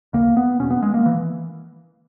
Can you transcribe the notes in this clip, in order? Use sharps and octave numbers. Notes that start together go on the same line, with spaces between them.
D#2 C#3 A#3
B3
E2 B2 C#4
B3
G#3
A#3
E3